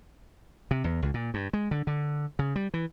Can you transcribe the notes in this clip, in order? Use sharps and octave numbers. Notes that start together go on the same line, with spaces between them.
C3
E2
C#2
A#2
G2
G#3
D3
D3
C#3
G3
E3